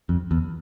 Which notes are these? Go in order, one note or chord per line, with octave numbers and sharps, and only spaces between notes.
F2
E2